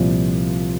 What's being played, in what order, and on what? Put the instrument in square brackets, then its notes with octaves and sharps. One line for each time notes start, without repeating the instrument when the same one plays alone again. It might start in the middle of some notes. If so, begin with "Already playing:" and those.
Already playing: [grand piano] C2 A#2 F3